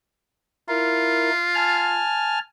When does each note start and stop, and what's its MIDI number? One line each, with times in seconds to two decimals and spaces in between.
0.69 1.30 64
0.69 2.02 65
0.69 1.30 70
1.55 2.39 80
1.55 2.39 81
1.55 2.39 89